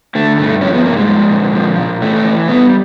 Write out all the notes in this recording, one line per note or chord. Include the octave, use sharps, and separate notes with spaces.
D3 A3
G2 A3
F3 C#4
B3
G2 A#3
G#3
F3
A#2
F3
A#2
E3 A3
E3
G3 B3